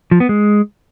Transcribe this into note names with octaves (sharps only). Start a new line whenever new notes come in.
F3
B3
G#3